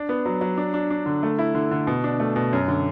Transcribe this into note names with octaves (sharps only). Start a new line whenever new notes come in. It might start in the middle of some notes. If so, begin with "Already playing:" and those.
Already playing: D4
B3
F#3
F#3
D4
D4
D4
D3
A3
E4
D3
D3
B2
D4
A3
B2
F#2
D3